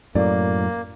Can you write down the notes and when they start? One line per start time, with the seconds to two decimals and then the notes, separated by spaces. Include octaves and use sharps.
0.15 F#2 A2 A#3 D5